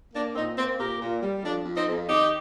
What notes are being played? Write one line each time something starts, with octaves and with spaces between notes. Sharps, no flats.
A#3 D4
A#2 C4 D#4
A#3 C4
A#2 G4 A#4
A#2
G3
F2 D4
F2
C4 D#4
F2
D#3 D#4 G4